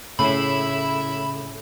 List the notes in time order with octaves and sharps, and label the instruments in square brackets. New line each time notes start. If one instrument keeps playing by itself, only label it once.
[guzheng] A2 [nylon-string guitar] C#3 [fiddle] E4 E5 [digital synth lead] B5